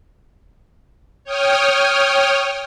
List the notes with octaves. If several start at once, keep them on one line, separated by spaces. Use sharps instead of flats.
C#5 G5 D#6 F6